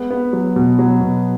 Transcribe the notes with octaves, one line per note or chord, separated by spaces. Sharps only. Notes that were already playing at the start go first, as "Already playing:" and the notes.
Already playing: G#3 B3
B3
F#3
B2
F#3
B2